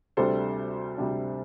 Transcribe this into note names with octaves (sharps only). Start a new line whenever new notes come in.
D2 C3 G3 D4 A4 C5
D2 C3 G3 D4